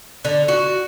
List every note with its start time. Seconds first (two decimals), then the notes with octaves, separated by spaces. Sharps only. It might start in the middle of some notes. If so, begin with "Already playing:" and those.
0.25 D3
0.48 F#4